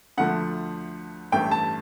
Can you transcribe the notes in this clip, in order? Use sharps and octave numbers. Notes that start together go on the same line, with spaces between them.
D2 D3 F3 A3 F#5
A1 G2 E3 A3 G5
A5